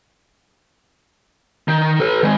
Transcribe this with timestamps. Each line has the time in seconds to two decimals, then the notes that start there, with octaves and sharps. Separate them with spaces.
1.68 D#3
2.00 A4 B4
2.23 D#3 G#3